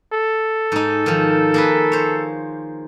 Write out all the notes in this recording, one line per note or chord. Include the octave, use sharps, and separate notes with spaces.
A4
G#2 D#4
D#3 F3
A#3 G#4 B4
C5 C#5